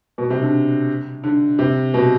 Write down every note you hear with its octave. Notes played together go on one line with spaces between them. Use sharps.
B2
C3
D3
D3
C3
B2